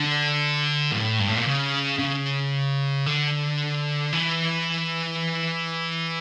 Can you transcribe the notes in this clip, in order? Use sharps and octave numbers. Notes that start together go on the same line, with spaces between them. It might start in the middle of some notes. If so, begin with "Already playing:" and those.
Already playing: D3
A2
G2
A2
A#2
C#3
C#3
D3
E3